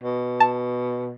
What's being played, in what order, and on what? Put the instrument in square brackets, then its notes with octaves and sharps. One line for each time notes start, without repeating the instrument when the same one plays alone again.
[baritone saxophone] B2
[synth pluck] A5